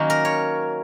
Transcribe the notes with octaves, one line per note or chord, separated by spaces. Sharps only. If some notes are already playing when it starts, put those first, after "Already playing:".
Already playing: D#3 F#3 A#3 C#4
A#4
C#5